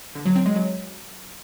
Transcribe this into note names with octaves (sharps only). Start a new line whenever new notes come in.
D3
F#3
C4
G#3
F#3